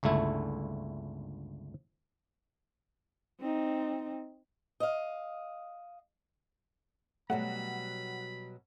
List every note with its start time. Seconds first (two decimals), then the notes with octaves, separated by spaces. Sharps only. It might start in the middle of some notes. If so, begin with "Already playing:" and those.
0.03 G1 C#2 D3 A3 E4
3.40 C4 D#4
4.80 D#5 F5
7.30 B2 F#3 G3 A3 F#5 B5